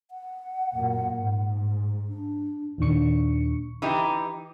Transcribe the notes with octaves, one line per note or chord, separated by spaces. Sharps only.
F#5
F#2 A#2 A#3
G#2
D4
D#2 A#2 D#3 D4 C#6 C#7
E3 D#4 G4